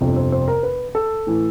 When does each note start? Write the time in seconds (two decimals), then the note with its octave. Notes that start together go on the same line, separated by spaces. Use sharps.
0.01 G1 F2 C3
0.16 C5
0.32 C5
0.48 A#4
0.63 B4
0.95 A4
1.27 A2 E3